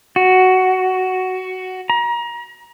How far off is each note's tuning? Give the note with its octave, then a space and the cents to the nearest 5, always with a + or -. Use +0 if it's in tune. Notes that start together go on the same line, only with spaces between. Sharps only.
F#4 +10
A#5 +30